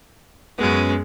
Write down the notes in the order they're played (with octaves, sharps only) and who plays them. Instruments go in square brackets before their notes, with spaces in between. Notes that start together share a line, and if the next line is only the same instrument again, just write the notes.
[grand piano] F#2 B3 [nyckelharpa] G#3 C#4